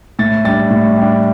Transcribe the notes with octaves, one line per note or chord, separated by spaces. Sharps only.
A2 A6
G3 D4 A6
A2
G3 D4